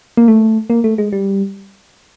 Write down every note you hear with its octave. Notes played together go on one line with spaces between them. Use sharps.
A#3
A3
A#3
A3
G#3
G3